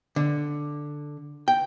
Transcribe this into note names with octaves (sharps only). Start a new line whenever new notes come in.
D3
G5